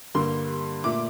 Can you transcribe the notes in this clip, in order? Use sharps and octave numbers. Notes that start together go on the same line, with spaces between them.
G2 D3 G3 A#3 C6
A#2 A3 D6